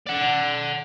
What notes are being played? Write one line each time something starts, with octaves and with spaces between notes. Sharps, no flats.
D5 F#5